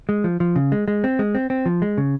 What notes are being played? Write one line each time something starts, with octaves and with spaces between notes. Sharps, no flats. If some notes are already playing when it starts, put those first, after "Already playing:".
G#3
F3
F3
C#3
G#3
G#3
C4
G#3
C4
C4
F3
G#3
C#3